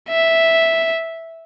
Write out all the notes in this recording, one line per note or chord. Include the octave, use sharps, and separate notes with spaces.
E5